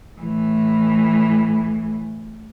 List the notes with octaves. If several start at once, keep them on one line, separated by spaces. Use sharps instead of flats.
A2 E3